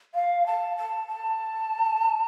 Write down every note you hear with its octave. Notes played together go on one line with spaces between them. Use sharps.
F5
A5
A5
A5